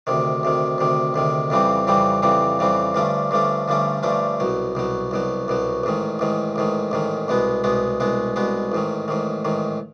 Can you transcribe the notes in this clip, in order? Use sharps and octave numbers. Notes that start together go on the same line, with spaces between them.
D2 C3 D#3
D2 C3 D#3
D2 C3 D#3
D2 C3 D#3
F2 C#3 E3 G3 C4
F2 C#3 E3 G3 C4
F2 C#3 E3 G3 C4
F2 C#3 E3 G3 C4
G2 D3 F3 A3 C#4
G2 D3 F3 A3 C#4
G2 D3 F3 A3 C#4
G2 D3 F3 A3 C#4
C2 B2 F#3
C2 B2 F#3
C2 B2 F#3
C2 B2 F#3
A1 G#2 D#3
A1 G#2 D#3
A1 G#2 D#3
A1 G#2 D#3
C2 B2 G#3 B3
C2 B2 G#3 B3
C2 B2 G#3 B3
C2 B2 G#3 B3
A1 G#2 D#3
A1 G#2 D#3
A1 G#2 D#3